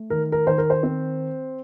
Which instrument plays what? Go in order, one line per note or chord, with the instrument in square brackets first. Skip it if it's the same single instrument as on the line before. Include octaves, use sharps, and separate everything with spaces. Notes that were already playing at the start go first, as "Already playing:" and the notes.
Already playing: [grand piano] A3
D#3 A#4
A#4
D#3 C5
A#4
C5
C4